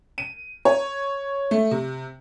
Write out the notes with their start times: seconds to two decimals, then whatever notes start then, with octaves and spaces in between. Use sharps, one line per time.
0.18 D#7
0.65 C#5
1.51 A3
1.71 C3